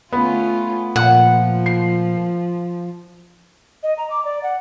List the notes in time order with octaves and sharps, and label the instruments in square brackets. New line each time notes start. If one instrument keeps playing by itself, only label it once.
[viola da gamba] A3 C#4 F4 [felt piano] B3
[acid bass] A#2 [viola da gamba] F3 [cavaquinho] F#5
[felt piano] C7
[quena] D#5
A#5
D6
D5
F#5